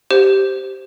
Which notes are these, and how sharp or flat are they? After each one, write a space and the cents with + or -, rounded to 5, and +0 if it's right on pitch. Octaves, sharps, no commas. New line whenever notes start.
G4 -10 C5 +0